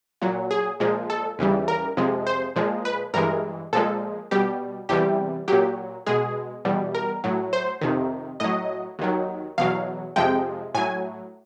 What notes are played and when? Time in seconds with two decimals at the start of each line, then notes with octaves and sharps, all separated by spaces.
0.22 A#2 F#3
0.51 G#4
0.80 A#2 F3 G#3
1.10 A4
1.39 D#2 C#3 E3 G3
1.68 A#4
1.97 F2 C3 F3 G#3
2.27 C5
2.56 A#2 F3 G#3
2.85 B4
3.14 G2 E3 G#3 A#4
3.73 A#2 F3 G#3 A4
4.31 B2 G3 G4
4.89 E2 C3 E3 G3 G4
5.48 A#2 F#3 G4
6.06 B2 G#3 G#4
6.65 E2 B2 G3
6.95 A#4
7.24 A2 F#3
7.53 C5
7.81 F2 C3 D#3
8.40 A2 F#3 D#5
8.99 D#2 D#3 F#3
9.58 E2 B2 F#3 F5
10.16 F2 C3 F3 G#3 G5
10.75 A2 F#3 G#5